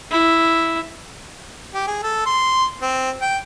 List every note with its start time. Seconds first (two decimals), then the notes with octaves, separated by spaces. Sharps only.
0.11 E4
1.74 G4
1.88 G#4
2.03 A4
2.26 C6
2.82 C4
3.21 G5